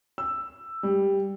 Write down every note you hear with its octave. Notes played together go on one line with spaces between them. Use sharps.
E6
G3